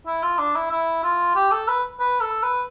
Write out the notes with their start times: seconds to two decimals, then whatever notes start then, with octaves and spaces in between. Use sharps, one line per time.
0.06 E4
0.23 F4
0.39 D4
0.55 E4
0.71 E4
1.03 F4
1.35 G4
1.51 A4
1.68 B4
2.00 B4
2.21 A4
2.43 B4